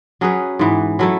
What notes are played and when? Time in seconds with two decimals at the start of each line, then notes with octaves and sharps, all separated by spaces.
0.21 F#3 C#4 G#4 B4
0.59 G#2 E3 B3
0.99 F#3 A3 E4 A4